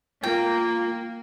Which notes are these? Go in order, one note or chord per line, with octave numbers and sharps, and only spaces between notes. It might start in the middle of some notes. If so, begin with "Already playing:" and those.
A#3 F4 G5